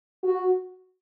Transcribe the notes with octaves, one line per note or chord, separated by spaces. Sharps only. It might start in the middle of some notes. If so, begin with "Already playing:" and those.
F#4